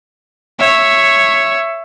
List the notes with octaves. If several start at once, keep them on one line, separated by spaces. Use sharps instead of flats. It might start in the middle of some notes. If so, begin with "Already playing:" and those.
C#5 E5